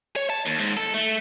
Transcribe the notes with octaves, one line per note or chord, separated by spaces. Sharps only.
C#5
A5
D#2
G#2
A4
A3